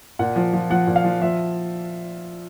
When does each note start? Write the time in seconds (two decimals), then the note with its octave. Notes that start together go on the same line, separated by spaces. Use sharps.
0.19 A#2 F#5
0.36 F3
0.53 F3
0.70 F3 F#5
0.87 A#2
0.96 F5
1.04 F3
1.21 F3 E5